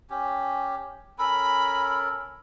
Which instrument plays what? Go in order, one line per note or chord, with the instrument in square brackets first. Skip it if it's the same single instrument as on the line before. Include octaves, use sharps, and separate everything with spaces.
[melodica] C#4 G4
[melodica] C#4 A4 A#4 [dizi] B5